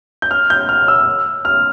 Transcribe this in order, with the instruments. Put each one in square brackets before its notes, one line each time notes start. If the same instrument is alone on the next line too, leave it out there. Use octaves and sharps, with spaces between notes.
[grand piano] G6
F6
G6
F6
E6
F6